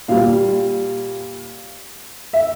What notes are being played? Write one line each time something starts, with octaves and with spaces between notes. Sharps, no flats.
A#2 G3 F5
E5